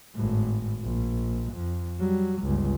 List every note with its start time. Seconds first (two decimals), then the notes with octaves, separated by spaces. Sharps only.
0.14 G#1 A2
0.83 A#1
1.54 F2
1.99 F#3 G3
2.43 G1 C#2